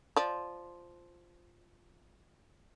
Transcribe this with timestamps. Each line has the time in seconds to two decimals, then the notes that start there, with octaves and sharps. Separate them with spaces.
0.16 F3 D5